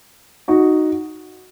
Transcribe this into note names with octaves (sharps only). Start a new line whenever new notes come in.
D#4 F#4